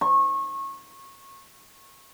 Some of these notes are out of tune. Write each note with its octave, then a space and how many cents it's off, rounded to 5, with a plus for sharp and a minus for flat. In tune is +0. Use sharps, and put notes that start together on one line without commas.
C#6 -25